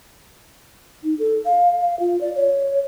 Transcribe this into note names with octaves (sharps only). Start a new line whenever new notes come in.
D#4
A4
F5
F5
F4
D5
C#5